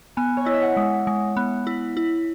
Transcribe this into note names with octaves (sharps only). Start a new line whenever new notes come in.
B3 G#5
C#5
E4 D#5
E5
F#5
G#3
G#3
B3
E4
E4